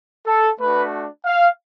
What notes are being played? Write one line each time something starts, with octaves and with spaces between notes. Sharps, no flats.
A4
A3 D4 F#4 B4
F5